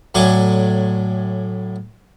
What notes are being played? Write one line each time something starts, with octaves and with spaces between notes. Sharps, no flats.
A2 F#3 D4 G#5 C#6 D6